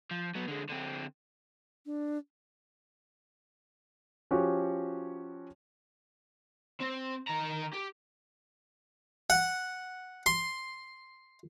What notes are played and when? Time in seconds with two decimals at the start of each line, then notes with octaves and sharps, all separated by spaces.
0.11 F3
0.35 F#3 B3
0.48 D3 G#3
0.69 D3 C4
1.85 D4
4.31 F3 C#4 F#4 G4 C#5
6.80 C4
7.27 D#3 A#5
7.73 G4
9.30 F#5
10.26 C6